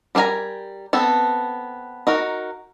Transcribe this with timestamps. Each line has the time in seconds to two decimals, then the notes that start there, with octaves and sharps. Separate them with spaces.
0.15 G3 D4 A#4 G#5 A#5
0.93 B3 C4 A4
2.07 D#4 F#4 A#4